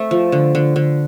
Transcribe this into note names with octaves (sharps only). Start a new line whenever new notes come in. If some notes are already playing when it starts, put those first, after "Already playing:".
Already playing: A3 C4 E5
F3
D3
D3
D3